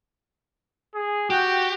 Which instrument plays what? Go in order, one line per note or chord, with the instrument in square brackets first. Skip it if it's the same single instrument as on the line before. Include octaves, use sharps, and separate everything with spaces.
[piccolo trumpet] G#4
[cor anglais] F#4 [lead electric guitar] G4 [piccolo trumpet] G5